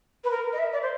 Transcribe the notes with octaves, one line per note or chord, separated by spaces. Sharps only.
B4
A#4
D#5
E5
D5
C5